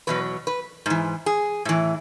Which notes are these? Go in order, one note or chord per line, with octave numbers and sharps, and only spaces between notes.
E2 B2 F#3 B4
B4
G#2 E3
G#4
A2 E3